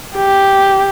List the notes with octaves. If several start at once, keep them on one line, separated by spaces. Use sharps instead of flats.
G4